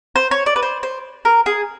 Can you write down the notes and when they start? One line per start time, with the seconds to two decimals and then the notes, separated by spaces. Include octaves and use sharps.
0.16 C5
0.31 C#5
0.46 D5
0.56 B4
0.63 C5
0.83 C5
1.25 A#4
1.46 G#4